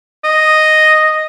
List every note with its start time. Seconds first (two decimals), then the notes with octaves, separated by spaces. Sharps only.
0.24 D#5